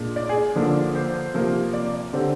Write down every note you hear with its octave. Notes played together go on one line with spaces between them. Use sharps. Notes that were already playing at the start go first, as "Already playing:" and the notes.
Already playing: A#2 G#3 D4
D5
G#4
D3 F3 A#3 D4
C5
C3 F3 A#3
D5
D3 G3 C4